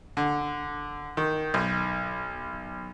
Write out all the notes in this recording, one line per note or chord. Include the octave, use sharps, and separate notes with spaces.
D3
D#3
B1